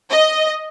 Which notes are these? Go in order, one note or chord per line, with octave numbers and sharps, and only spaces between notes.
D#5